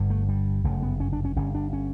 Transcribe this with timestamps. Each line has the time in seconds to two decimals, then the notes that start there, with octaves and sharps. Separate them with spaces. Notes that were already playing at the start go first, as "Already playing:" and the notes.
Already playing: G1 G2 D3
0.10 A3
0.29 G3
0.64 G1 F#2 C#3 A3
0.83 B3
1.00 C#4
1.13 D4
1.25 C#4
1.36 G1 G2 D3 C#4
1.55 D4
1.73 C#4